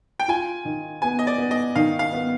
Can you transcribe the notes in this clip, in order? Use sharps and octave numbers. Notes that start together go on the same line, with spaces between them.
G5
F4 G#5
D#3
B3 G#5
D#5
D5
B3
D#5
D#3 F5
F5
B3